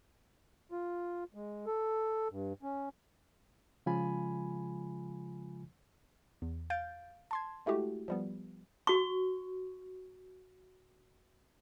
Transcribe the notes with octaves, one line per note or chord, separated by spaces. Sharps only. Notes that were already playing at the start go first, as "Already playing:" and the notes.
F4
G#3
A4
G2
C#4
C#3 F3 G#3 F4 G#5 B5
E2
F5 G6 A6 D7
A5 C6 G#6
G#3 A3 E4 F#4 G4
F3 G3 B3
F#4 C#6